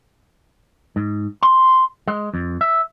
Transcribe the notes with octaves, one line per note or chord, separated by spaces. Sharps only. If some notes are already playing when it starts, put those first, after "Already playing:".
G#2
C6
G#3
F2
E5